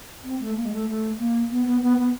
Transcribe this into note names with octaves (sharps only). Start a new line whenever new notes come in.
C4
A3
A#3
G#3
A3
A3
A#3
B3
B3
B3
B3